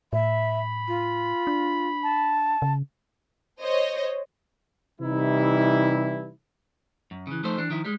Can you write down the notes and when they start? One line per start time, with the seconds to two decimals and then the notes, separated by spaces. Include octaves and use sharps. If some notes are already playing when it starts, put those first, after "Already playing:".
0.13 A2 E5 B5
0.88 F4
1.47 D4
2.03 A5
2.62 C#3
3.61 C5 C#5 D#5
5.01 C3 E3 G3 D#4 E4
7.11 F#2
7.27 C#3 E3
7.43 F3 A3 D#4 C5
7.58 E3 D4
7.70 D#3 F3 E4
7.85 G3 G#3